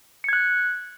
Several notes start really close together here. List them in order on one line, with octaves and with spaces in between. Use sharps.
C#7 G#6 F#6